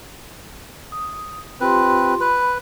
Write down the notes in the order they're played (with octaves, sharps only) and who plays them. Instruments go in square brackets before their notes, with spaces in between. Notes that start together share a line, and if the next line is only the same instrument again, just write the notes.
[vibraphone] D#6
[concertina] C4 B4 [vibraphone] F4 G4 C6
[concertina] B4 [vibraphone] B5